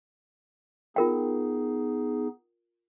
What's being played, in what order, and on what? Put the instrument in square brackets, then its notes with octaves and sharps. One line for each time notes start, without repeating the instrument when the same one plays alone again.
[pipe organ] B3 D#4 G#4 [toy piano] F4 A#4 G5